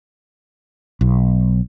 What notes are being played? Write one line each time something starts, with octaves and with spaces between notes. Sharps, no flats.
B1